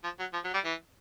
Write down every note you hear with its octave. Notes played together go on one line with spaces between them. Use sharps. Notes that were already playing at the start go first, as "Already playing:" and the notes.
F3
F#3
F3
F#3
G3
E3